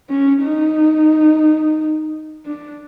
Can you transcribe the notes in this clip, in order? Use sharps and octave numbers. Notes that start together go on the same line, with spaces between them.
C#4
D#4
D4